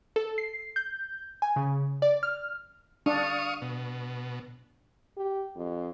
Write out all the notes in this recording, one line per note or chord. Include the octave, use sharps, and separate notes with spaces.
A4
C7
G6
G#5
C#3
D5
F6
D4 F5 C#6 D#6
B2
G4
F2